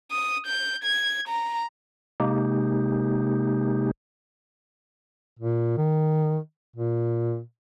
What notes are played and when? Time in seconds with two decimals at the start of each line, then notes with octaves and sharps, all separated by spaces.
0.11 D#6
0.46 G6
0.84 G#6
1.28 A#5
2.20 C3 G#3 A#3 D#4 G4
5.39 A#2
5.78 D#3
6.76 A#2